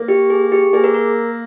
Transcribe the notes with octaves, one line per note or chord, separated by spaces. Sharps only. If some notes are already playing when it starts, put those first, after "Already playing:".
Already playing: A#3
G4
G#4
G4
A#3 G#4
A#4
A#4